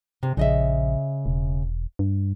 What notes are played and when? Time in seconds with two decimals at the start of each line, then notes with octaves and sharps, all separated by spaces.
0.23 C3
0.37 A#1 C#3 D#5 E5
1.26 E1
1.99 G2